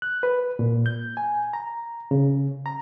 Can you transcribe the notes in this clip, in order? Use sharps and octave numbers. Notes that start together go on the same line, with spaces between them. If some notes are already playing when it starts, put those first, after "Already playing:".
F#6
B4
A#2
G6
G#5
A#5
C#3
A#5